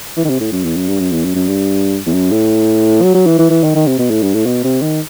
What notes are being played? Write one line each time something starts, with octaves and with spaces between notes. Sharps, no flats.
E3
D#3
C3
A2
F#2
E2
F#2
G2
F#2
E2
F#2
F#2
G2
E2
F#2
A2
F#3
F#3
E3
E3
E3
D#3
D#3
C3
B2
A2
G2
A2
B2
C3
D#3